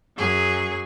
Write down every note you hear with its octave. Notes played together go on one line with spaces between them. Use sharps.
F#2 F#3 G#4